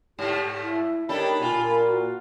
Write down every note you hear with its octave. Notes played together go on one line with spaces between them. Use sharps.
G#2 A3 G4
E4
G3 A#3 D4 D#4 G4 A4 C#5 B5
A#2 F4 G#5
F#4